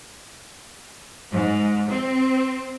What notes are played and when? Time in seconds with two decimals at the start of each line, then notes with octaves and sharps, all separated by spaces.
1.32 G#2
1.90 C4